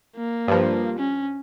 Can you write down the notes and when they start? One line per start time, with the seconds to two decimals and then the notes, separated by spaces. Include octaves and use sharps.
0.17 A#3
0.48 G2 F3
0.98 C#4